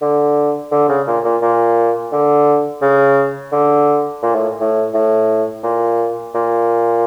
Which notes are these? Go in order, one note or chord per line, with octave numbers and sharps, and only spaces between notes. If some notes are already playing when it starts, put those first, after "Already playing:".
D3
D3
C#3
A#2
A#2
A#2
D3
C#3
D3
A#2
A2
A2
A2
A#2
A#2